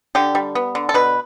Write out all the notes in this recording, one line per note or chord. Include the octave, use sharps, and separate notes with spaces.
D3 G4
G3
B3
D3
A4
B2 B4